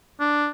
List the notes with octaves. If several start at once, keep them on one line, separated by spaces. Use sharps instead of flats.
D4